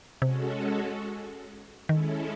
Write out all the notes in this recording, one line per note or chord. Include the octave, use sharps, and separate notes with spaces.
C3 G#3 C#4 F#4 A4
D#3 G#3 C#4 E4 A4